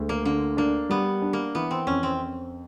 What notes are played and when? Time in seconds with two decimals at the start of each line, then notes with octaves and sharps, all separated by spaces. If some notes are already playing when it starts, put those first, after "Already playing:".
Already playing: D2 G#3
0.09 A#3
0.25 D3 A#3
0.57 A#3 D4
0.89 G3 B3
1.22 D4
1.33 A#3
1.55 E3 B3
1.71 C4
1.87 F2 C#4
2.03 C4